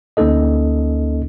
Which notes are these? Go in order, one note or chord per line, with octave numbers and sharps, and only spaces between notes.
D2 A#3 C#4 D#4 A4 D#5